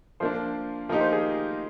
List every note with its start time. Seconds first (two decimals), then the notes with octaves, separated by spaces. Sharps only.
0.20 F3 A#3 D4 C5
0.89 F3 A#3 D#4 G4 A#4
1.01 C5
1.12 G#4